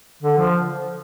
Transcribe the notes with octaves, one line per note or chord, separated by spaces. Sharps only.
D3
F3